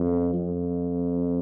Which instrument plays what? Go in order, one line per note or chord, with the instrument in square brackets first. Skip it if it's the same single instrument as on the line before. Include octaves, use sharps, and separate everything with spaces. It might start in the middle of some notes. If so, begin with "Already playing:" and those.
Already playing: [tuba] F2
F2